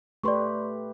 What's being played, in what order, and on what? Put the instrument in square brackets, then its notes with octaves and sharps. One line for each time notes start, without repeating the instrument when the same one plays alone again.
[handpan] A3 G4 B4 [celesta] D5 C6 C#6